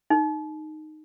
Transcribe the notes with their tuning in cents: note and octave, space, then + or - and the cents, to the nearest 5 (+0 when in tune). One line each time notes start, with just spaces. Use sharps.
D#4 -10